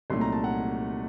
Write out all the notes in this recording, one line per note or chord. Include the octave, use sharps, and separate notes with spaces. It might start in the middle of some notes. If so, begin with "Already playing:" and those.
C2 A#2 F#3 A3 D#4 C6
A#5
A5
F#5 A#5